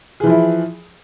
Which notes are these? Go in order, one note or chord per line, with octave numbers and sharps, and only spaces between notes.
E3 F3 E4 G#4